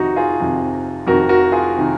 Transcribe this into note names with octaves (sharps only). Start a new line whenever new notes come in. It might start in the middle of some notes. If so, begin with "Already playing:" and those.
Already playing: F2 C3 D#3 D#4 F#4
F4 G#4
F2 C3 D#3
F2 C3 D#3 F#4 A#4
F#4 A#4
F4 G#4
C3 D#3